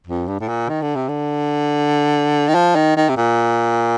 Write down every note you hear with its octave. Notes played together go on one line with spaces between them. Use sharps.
F2
G2
A2
A#2
D#3
D3
C3
D3
D#3
F3
D#3
D#3
C3
A#2